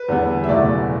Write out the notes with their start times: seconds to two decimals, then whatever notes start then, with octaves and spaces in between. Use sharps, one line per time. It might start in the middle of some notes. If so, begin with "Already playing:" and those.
Already playing: B4
0.08 E2 D3 G3 B3
0.44 E5
0.49 F#1 E2 B2 A3 D5